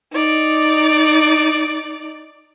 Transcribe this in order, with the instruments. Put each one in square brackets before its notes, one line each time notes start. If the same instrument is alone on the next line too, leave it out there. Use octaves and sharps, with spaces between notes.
[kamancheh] D#4 D5